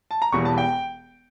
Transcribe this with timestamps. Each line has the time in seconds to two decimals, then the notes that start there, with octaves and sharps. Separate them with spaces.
0.11 A5
0.22 A#5
0.33 E1 E2 E3 G3 C#6
0.45 A5
0.58 G5